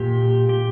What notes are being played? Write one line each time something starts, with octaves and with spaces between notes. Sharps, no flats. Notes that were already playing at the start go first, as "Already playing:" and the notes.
Already playing: A#2 G4
G4